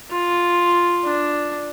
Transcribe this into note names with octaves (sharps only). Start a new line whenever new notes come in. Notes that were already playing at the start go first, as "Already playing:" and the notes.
F4
D4